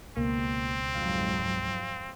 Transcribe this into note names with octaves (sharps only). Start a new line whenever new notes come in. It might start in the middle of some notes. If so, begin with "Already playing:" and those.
C#2 B2 A#3 C4
F2 G#2 F#3 F5